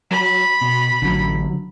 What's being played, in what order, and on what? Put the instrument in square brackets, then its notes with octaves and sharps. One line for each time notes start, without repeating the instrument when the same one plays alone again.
[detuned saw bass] F#3 [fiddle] B5
[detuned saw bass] B2
[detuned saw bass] A1 [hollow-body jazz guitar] D3 F#3